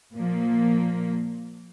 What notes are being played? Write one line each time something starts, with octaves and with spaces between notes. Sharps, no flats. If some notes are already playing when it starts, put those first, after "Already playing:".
A#2 F3 A#3